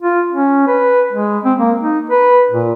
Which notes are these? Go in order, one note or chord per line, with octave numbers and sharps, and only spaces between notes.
F4
C#4
B4
G#3
C4
A#3
D#4
B4
A#2